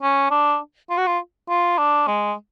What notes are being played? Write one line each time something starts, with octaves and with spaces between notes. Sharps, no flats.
C#4
D4
F4
F#4
F4
F4
D4
G#3